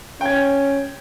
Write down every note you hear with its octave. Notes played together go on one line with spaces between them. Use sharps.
C#4 G5 G#6